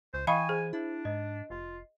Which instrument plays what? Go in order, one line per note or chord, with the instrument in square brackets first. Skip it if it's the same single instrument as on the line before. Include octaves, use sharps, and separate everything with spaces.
[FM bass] C#2 [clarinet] C5
[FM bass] E3 [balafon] D#5 F5 B5 [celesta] G5 C#6 D#6 [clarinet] G#5
[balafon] G#4 [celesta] C5
[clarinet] D4 [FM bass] E4
[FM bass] G#2 [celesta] D#5
[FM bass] F1 [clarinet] F4